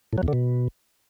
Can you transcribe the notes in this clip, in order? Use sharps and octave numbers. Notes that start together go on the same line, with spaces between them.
A2
F#3
E2
D3
B2